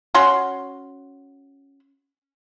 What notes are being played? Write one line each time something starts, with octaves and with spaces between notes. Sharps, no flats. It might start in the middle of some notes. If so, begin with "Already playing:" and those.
C#4 F#4 C6